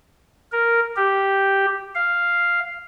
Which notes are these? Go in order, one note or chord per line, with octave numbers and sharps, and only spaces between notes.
A#4
G4
F5